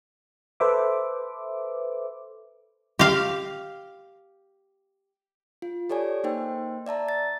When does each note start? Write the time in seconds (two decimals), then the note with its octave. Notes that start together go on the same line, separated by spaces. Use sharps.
0.60 A4 B4 C5 E5 D6
2.99 G4 F5
5.62 F4
5.90 G4 A4 C#5 D5 G#5
6.24 A#3 D#4 C5 G5
6.86 D5 E5 A5 A#5
7.09 A6